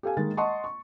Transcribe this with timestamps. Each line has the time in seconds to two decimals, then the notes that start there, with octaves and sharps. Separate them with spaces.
0.03 G4 A4 F5 G#5
0.17 D#3 G#3 A#3 A6
0.37 D#5 F#5 A5 C6 C#6
0.64 C#6